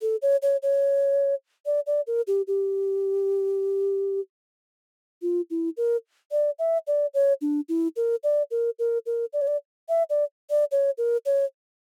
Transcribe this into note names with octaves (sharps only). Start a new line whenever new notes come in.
A4
C#5
C#5
C#5
D5
D5
A#4
G4
G4
F4
E4
A#4
D5
E5
D5
C#5
D4
E4
A#4
D5
A#4
A#4
A#4
D5
C#5
D5
E5
D5
D5
C#5
A#4
C#5